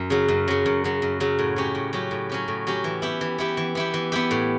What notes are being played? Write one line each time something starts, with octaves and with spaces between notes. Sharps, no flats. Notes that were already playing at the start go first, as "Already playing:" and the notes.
Already playing: F#2
C#3 F#3
F#2
C#3 F#3
F#2
C#3 F#3
F#2
C#3 F#3
A2
F#3 C#4 G4
A2
F#3 C#4 G4
A2
F#3 C#4 G4
A2
F#3 C#4 G4
E3
B3 E4 G4
E3
B3 E4 G4
E3
B3 E4 G4
E3
B3 E4 G4
A2